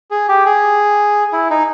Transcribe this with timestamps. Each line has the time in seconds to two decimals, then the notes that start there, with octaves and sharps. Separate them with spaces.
0.11 G#4
0.28 G4
0.45 G#4
1.33 E4
1.50 D#4